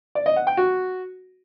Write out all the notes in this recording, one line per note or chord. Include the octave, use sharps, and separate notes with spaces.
D5
D#5
F#5
G5
F#4